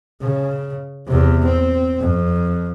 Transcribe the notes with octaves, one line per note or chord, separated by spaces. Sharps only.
C#3
E2 C3
C4
F2